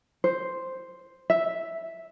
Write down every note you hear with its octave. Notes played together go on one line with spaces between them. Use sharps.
C5
E5